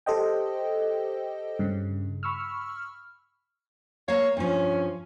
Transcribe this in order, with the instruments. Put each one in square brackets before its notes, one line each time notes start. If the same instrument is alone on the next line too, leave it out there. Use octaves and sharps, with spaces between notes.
[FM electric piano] G4 A4 C5 D#5 G5
G2 C#3
B5 C#6 E6 F6
[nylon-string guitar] A#3 F5 [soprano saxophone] C#5
[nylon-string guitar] G2 F3 [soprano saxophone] C#4